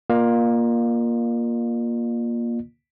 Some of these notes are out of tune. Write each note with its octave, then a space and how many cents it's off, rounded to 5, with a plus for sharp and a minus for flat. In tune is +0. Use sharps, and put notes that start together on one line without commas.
A#3 +15 F4 +10 D5 +45